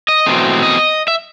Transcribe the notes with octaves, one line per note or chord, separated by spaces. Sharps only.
D#5
E2 B2 F#3 A3 C4
D#5
E5